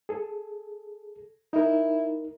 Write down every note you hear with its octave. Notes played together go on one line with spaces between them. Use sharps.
G#4 A4
D#4 E4 A#4